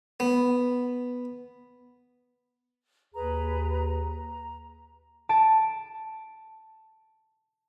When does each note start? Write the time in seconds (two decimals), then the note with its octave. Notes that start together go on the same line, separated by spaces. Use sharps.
0.20 B3
3.14 D#2 G#4 B4 A#5
3.86 A#5
5.29 A5 D7